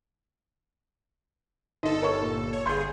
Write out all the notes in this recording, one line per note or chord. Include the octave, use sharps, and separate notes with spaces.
G1 D#4 A4 D#5
A#4 C#5 C#6
A#2
C#5
G1 G2 G#4 C6 G6